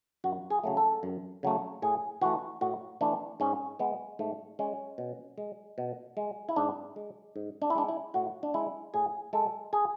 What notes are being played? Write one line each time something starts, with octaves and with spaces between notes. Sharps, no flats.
F#2 F#4
G#4
C#3 F#3 A3
A4
F#2
C#3 F#3 A3
A2 G#4
E3 A3 F#4
A2 F#4
E3 A3 D4
G#2 C#4
G#3 B3
G#2 A3
G#3 C#4
B2
G#3
B2
G#3
E4
G#2 D4
G#3
G#2
D4
E4
G#3 D4
E4
A2 F#4
D4
G#3 E4
A2 G#4
G#3 A4
G#4